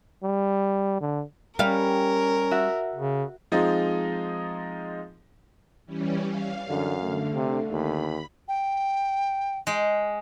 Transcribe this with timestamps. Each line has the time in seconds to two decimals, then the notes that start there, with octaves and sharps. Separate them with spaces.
0.23 G3
1.01 D3
1.59 G3 C#4 A#4 F5
2.51 F#4 E5
2.96 C#3
3.52 F3 G#3 C4 D#4 F4
5.86 E3 G3 C#4
6.26 F5
6.69 F#2 D3
7.02 D3 A3
7.33 C3
7.71 D#2 B5
8.48 G5
9.67 G#3 G5